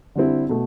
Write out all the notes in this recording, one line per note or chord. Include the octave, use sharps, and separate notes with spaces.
D3 G3 C4 E4
B2 A3